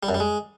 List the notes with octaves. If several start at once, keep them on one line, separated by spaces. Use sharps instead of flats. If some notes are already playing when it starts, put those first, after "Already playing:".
G3
F#2
G3
G#3